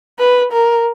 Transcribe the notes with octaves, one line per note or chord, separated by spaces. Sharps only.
B4
A#4